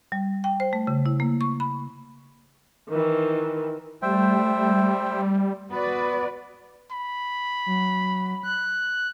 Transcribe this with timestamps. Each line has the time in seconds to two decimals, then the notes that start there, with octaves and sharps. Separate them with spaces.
0.12 G3
0.44 G5
0.60 C5
0.73 A3
0.87 C#3
1.06 E4
1.20 A#3
1.41 C#6
1.60 B5
2.89 D#3 E3
4.02 G3 A3 C5 E5 G5
5.70 B3 F#4 B4 D5
6.91 B5
7.66 F#3
8.43 F#6